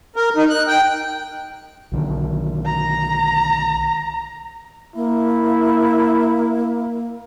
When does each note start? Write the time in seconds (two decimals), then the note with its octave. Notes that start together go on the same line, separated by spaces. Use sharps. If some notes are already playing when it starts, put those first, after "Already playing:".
0.16 A#4
0.37 D#4
0.50 F#6
0.68 G5
1.92 B1 D3 D#3
2.65 A#5
4.95 A#3 E4